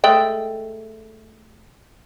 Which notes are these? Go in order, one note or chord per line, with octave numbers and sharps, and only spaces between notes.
G#3 A3 G5